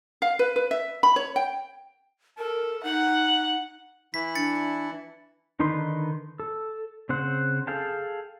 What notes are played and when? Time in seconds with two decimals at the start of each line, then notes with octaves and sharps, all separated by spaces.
0.22 F5
0.39 B4
0.56 B4
0.71 E5
1.03 B5
1.16 C#5
1.36 G5
2.38 A4 A#4
2.83 D#4 F#5
4.14 E3 E4 B6
4.35 D4 A6 C#7
5.60 D3 D#3 D#4 B4 C6
6.40 A4
7.09 C#3 C4 C5 F#5
7.67 G#4 A4 F5 G5 A5